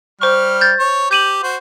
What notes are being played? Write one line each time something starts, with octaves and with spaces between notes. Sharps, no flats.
G3 C5 C#6 F6
G6 A6
C#5
G4 G6 D#7 F#7
F#4 C5